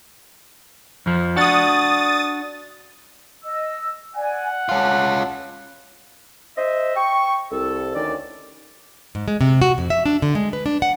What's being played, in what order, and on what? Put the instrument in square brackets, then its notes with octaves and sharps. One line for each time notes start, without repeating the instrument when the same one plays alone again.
[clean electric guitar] F2 F3
[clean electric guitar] D4 F#4 [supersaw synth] D#6 A6
[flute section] D#5 E6
[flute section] D5 G#5 [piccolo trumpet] F#5
[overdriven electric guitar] C#4 F4 [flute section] A5
[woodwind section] C5 D#5 E5
G5 C#6
C2 A4
D2 D#3 C#4 D5
[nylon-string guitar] G#2
G#3
C3
F#4
F2
E5
D4
D3
G#3
B4
D4
F#5